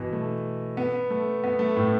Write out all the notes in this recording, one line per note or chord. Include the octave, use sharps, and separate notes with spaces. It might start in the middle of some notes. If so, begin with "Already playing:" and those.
Already playing: B2 E3
A3
B3
A3
B3
A3
A2